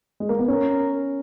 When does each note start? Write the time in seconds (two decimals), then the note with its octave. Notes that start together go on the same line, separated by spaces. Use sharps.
0.20 G#3
0.29 A#3
0.39 B3
0.48 C#4 A#4